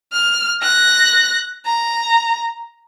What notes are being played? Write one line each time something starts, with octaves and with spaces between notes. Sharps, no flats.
F6
F#6 A#6
A#5